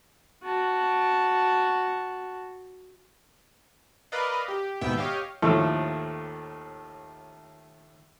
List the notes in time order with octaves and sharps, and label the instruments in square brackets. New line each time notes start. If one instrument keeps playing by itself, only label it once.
[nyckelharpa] F#4 A5
[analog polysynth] A#4 B4 D5 D#5 F5
G4
D#2 G#2 B2 B3 E5 G5
G4 C#5 D#5 F5
[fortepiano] D#2 A2 F3 A3 A4